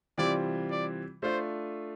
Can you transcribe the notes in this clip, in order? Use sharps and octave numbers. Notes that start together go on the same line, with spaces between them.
C3 E3 G3 C4 F4 D5
D5
A3 D4 F4 C5